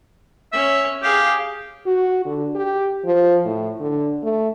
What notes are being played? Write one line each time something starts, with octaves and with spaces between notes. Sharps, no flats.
C#4 C#5 E5
G4 G#4 F5
F#4
D3
G4
F3
A2
D3
A3